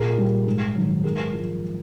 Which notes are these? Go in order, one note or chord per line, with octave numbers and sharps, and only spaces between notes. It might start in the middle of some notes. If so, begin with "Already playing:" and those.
Already playing: A#2 G#4 A#4
G3
G#2
D#3 F#3
G#2 G#4 A#4
F3 G#3